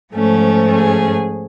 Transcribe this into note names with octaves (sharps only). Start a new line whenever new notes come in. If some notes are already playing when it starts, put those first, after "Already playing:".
G#2 F3 A3 C#4
G#4